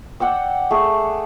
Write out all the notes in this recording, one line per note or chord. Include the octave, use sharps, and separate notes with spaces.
D5 F#5 G5 E6
A3 G#4